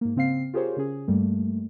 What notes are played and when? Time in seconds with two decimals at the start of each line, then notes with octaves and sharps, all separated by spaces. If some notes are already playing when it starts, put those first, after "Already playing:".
0.01 G#2 A#3
0.16 C#3 C4 F5 C7
0.54 F4 G4 G#4 A#4 C5 C#5
0.77 C#3 C#4 G#4
1.08 G2 G3 A3 A#3